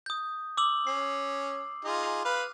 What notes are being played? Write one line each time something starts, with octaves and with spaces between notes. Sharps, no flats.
D#6 G6
D6 E6 F#7
C#4 C7
D#4 F4 G#4
B4 F5